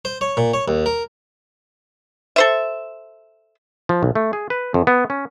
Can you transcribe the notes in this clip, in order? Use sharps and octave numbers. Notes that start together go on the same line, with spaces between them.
C5
C#5
A#2
C#5
D#2
A#4
A4 C5 E5
F3
B1
A3
G#4
B4
F2
B3
C#4